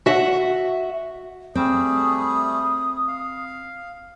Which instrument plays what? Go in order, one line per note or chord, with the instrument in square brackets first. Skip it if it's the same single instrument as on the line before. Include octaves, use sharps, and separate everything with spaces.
[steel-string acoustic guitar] F#4 E5
[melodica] G3 A3 G#4 [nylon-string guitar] C4 [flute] D#6
[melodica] F5